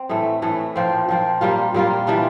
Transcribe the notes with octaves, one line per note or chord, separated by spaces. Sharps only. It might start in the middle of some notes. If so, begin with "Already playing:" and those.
Already playing: C4
A2 E3 A3
A2 E3 A3
A#2 F3 C4
A#2 F3 C4
A#2 G3 A#3 F4
A#2 G3 A#3 F4
E3 G3 D4 F4